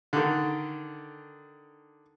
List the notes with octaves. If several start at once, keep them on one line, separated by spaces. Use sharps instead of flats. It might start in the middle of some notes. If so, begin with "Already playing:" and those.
D3 D#3